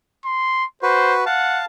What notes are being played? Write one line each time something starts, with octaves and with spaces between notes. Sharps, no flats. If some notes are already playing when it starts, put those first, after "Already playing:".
C6
F#4 B4 C5
F5 F#5 A5